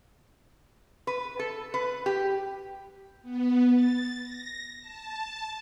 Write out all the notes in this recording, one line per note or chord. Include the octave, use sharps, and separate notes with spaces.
B4
A4
B4
G4
B3
A6
A#6
A5